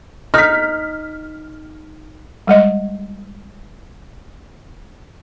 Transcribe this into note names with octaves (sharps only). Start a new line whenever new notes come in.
D#4 F6 B6
G3 G#3 D#5